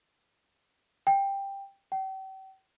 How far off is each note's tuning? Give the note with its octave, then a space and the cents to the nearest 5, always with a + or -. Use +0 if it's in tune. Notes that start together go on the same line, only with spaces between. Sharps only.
G5 +10
G5 -40